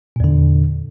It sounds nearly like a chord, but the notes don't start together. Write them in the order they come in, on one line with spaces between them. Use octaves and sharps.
A#2 E2 D3